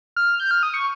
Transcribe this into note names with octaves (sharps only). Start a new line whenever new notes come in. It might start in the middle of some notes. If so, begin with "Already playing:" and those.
F6
G6
F6
D#6
C#6